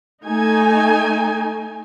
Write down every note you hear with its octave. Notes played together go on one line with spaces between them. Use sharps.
A3 D#4 G#5